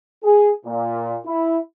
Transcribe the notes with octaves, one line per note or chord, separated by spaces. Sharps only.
G#4
A#2
E4